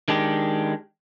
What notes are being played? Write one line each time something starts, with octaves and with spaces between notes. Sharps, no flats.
D#3 G#3 D4 G4